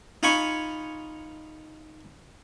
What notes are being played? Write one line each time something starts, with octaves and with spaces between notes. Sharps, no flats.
D#4 F4 G#5 B5 C#6